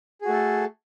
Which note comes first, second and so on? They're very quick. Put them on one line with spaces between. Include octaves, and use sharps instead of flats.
G#4 F#4 A3 A4